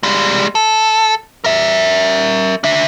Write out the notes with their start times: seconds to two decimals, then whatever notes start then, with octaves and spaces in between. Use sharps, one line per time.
0.03 G3 G#3
0.55 A4
1.44 A#4 E5
2.64 D4 E5